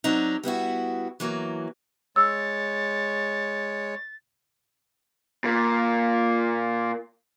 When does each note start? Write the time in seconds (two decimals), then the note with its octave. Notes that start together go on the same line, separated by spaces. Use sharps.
0.04 F#3 C4 D4 D#4
0.43 G3 B3 E4 F#4
1.20 E3 F#3 A#3
2.16 G#3 C#5 E6 A6
5.44 A#2 A#3